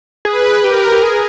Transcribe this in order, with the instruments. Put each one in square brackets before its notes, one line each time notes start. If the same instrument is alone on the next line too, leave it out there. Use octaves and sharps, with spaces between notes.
[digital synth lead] G#4 [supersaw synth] B4
[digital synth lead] G4 [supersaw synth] A#4
[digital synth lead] G4
G#4